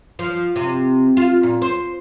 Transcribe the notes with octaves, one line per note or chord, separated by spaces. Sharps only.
F3
C3
F4
A#2
C5